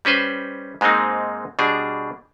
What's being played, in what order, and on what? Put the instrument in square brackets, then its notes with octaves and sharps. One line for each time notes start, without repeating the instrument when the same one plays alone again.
[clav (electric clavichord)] G3 C#4 B4 C5
G#2 G#3 A#3 C4 D#4
B2 G3 D4 G#4